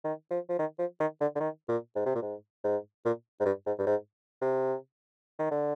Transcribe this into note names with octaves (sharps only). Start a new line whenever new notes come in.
D#3
F3
F3
D#3
F3
D#3
D3
D3
D#3
A#2
G#2
C3
A#2
G#2
G#2
A#2
G#2
G2
G#2
G2
G#2
C3
D#3
D3